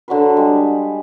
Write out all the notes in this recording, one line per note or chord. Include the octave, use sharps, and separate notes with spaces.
D3 F#3 F#4 B4
G3 G#3